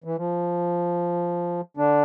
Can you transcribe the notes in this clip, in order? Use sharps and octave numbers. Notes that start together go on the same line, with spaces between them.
E3
F3
D3 D4